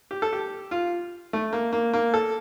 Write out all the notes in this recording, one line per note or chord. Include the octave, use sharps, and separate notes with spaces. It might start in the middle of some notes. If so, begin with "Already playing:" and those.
G4
A4
G4
F4
A3
A#3
A#3
A#3
A4